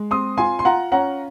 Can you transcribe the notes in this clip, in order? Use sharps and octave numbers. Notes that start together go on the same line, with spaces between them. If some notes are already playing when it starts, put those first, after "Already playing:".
Already playing: G#3
C4 C6 D#6
F4 G#5 C6
C6
F4 F#5 A#5
C#4 F#5 A#5